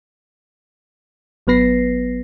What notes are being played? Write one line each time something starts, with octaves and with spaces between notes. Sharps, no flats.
G#1 F#3 B3 B4 A#6 C7